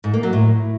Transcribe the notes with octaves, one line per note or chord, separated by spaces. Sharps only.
G#2
A#3
F#3
A2